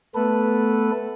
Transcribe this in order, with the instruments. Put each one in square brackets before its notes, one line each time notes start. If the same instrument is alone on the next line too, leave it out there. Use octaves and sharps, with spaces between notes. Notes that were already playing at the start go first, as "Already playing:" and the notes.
[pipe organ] A3 B3 A4 B4